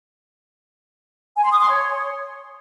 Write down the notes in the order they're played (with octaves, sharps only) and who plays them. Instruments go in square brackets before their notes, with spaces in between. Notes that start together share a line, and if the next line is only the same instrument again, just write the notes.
[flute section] G#5
C6
D#6
C6
C#5